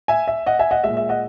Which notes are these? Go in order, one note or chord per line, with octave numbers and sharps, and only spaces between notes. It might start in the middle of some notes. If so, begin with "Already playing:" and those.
E5 G#5
E5
D#5 F#5
E5 G#5
D#5 F#5
A#2 G#3 E5
E5
D#5 F#5